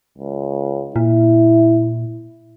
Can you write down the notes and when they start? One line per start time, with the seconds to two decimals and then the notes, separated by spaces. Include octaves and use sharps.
0.18 C#2
0.96 A#2 E4